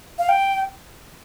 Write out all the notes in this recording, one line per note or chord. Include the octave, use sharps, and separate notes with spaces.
F5
G5